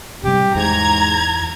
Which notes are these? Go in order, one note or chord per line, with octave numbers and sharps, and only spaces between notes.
A2 C3 G3 G4
E2 G#2 E3 A#5 G#6